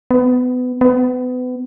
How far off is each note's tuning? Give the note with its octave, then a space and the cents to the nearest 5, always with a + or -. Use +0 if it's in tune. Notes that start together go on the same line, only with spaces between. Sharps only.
B3 +25
B3 +30